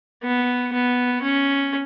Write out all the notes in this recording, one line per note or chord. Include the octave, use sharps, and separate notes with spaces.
B3
B3
C#4